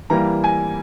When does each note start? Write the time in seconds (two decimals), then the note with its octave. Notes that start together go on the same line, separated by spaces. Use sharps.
0.10 E3 G3 A#3 E4 A#5
0.44 G#5